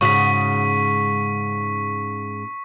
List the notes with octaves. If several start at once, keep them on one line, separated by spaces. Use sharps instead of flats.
G#2 C#3 F#4 C#6 B6